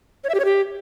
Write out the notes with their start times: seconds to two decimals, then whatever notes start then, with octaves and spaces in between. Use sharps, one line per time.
0.24 C#5
0.29 E5
0.34 G4
0.40 C#5
0.45 G4